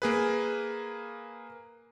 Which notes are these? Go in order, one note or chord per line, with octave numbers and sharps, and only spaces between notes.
A#3 G#4 B4